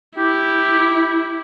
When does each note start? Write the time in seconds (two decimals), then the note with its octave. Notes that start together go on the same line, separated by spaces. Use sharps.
0.18 E4 G4